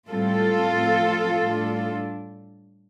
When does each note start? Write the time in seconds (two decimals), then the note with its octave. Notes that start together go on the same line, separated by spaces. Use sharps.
0.09 A2 G3 C4 F4 A4
0.75 A2 F3 C4
1.42 A2 G3 D4